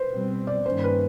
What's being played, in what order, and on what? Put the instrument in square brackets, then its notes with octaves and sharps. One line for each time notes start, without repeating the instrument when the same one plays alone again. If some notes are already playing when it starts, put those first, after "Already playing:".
Already playing: [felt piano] B4 C5
[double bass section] B2 G3 C4
[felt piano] D5
[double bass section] G2 D#3 G3 A#3 C#4 [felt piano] C5
[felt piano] B4